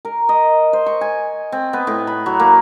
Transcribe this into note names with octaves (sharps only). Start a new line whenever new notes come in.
A#4
D#5
C5
C#6
G#5
C4
B3
A2
B5
F#3
A#3